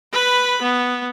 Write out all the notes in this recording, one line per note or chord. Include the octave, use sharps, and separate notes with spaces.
B4 B5
B3